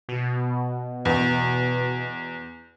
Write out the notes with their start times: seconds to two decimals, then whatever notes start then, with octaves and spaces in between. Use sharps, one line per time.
0.09 B2
1.05 E2